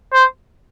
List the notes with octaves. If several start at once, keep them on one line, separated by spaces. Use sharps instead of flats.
C5